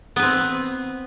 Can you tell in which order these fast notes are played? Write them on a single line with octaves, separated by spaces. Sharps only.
B3 B4 C4